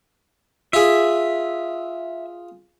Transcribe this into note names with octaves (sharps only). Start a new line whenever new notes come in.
F4 G#4 E5